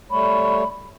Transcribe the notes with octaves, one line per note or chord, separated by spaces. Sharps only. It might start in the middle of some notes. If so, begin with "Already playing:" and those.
G3 A3 C#5 B5